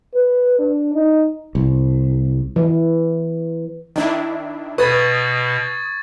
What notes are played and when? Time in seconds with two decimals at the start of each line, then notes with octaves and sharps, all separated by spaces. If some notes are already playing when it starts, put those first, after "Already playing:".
0.14 B4
0.58 D4
0.95 D#4
1.55 C2
2.56 E3
3.96 D#3 D4 E4
4.78 B2 B4 C#6 D#6 G#6 A6